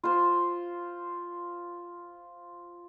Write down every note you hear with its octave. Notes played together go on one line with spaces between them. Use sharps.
F4 C5